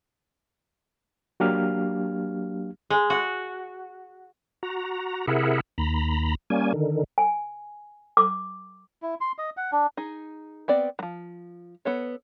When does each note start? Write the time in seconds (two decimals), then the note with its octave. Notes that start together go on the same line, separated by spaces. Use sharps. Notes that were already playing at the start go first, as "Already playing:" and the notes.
1.40 F#3 A#3 D4 G4 F5 F6
2.90 G#3
3.10 F#4
4.63 F#4 A#5
5.27 C3 E4 G#4 A#4 E5 F#5
5.78 D#2 A#5 B5
6.50 G3 A#3 C#4 G#5
6.74 D3 D#3
7.18 G#5
8.17 D6
9.02 E4
9.21 C6
9.38 D#5
9.57 F#5
9.72 D4
9.97 D#4 G#4
10.68 B3 C4 D5
10.99 F3 F#3
11.85 B3 A4 C#5